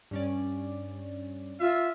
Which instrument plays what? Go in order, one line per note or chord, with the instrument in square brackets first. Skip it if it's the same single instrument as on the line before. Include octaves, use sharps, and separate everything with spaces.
[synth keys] G2 C#4 D5
[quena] F4 [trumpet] E5